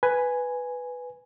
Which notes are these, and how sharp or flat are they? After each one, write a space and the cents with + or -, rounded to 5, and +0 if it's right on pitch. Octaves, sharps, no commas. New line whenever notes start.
B4 +5 G#5 +0